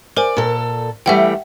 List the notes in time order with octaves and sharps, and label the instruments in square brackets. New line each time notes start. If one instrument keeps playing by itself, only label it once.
[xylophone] A#4 C5 G#5 [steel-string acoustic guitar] D5
[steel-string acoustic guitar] A#2 A4
[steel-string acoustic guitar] E3 G3 A3 [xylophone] E5 F#5 G5